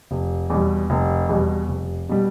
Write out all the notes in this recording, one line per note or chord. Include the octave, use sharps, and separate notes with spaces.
F1
E2 B2 G3
F1
E2 B2 G3
F1
B2 G3